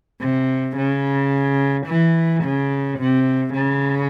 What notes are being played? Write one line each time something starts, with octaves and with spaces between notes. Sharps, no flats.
C3
C#3
E3
C#3
C3
C#3